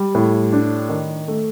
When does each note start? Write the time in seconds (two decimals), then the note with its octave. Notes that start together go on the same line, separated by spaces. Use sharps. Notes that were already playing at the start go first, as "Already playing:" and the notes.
Already playing: G3
0.15 A2
0.53 D4
0.89 D#3
1.28 A3